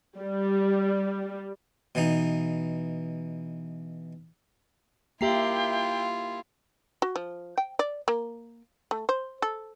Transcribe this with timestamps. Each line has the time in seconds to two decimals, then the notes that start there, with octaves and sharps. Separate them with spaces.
0.19 G3
1.95 B2 E3 D#4
5.21 A#3 E4 F4 G4 E5 G5 A#5 C7
7.02 F#4
7.16 F3
7.58 G5
7.79 D5
8.08 A#3
8.91 A3
9.09 C5
9.42 A4